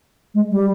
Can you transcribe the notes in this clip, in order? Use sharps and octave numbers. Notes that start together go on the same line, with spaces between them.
G#3
G3